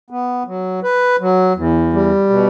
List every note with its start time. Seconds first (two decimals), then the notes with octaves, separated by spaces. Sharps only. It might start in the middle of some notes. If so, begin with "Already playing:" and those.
0.10 B3
0.47 F#3
0.83 B4
1.20 F#3
1.56 E2
1.93 G3
2.30 B2